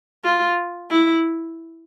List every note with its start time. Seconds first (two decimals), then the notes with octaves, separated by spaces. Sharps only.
0.24 F4
0.90 E4